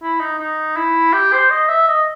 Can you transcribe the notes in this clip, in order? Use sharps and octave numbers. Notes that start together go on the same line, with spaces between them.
E4
D#4
D#4
E4
G4
C5
D#5
E5
D#5